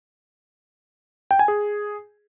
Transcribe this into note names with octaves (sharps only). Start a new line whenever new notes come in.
G5
G#5
G#4